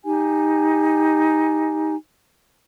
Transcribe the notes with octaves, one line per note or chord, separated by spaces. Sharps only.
D#4 G4 G#5